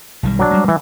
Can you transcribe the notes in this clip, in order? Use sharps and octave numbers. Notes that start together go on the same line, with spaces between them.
B1 D#3 G3
F#3 D4 D5
G3 G#3
E3